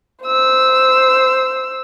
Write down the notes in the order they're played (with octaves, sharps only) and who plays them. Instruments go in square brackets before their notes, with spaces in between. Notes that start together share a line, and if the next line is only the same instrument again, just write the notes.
[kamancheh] C5 E6